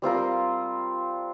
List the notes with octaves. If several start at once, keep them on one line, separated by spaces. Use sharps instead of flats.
G3 C4 F4 A#4